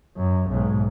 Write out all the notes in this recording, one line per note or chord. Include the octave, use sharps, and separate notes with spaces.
F#2
B1 G#2